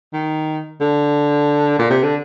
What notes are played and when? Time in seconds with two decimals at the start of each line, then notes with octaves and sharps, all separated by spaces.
0.13 D#3
0.81 D3
1.79 A#2
1.90 C3
2.03 D3